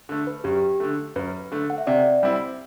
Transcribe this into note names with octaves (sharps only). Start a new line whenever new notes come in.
D3 A3
B4
F#2 G4
D3 A3
F#2 B4
D3 A3
F#5
E5
C3 D5
G3 C4 E4